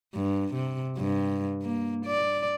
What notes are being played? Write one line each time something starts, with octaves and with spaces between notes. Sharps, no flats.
G2
C3
G2
A#3
D5